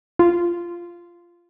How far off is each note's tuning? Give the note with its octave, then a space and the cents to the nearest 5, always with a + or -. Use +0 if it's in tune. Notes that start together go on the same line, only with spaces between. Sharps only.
F4 -10